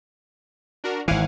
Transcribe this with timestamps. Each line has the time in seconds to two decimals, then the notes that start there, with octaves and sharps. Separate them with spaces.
0.84 D4 F#4 A#4
1.08 G#1 E3 F5 F#5 G#5